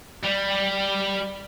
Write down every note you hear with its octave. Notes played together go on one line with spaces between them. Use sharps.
G3